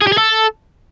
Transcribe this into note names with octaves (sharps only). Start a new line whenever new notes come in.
G#4
G4
G#4
A4